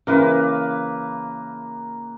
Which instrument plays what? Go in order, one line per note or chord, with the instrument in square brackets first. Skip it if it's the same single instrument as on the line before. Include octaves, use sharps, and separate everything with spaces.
[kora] C#3 E3 [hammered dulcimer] A#3 A#4 B4